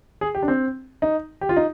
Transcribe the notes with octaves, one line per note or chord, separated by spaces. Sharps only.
G#4
G4
D4
C4
D#4
G4
F4
D#4